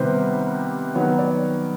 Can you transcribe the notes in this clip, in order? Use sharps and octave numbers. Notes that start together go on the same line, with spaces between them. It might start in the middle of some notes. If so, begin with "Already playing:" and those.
Already playing: C3 D#3 G3 B3 B4 C5
D#3 F#3 B3 C#5
D5